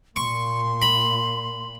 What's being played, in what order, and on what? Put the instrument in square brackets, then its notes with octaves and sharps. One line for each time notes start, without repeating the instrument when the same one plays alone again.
[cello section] A#2 [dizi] C6 [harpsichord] C#6
[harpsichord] B5